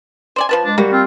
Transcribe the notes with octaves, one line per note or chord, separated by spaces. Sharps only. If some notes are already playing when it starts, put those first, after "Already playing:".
C5 D5 G#5
F3 B4 A5
G#3 D4
G3 A#3 F#4
C4 F4